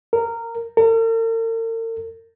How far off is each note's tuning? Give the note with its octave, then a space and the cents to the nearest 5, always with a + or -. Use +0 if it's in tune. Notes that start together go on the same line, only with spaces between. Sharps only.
A#4 -15
A#4 -45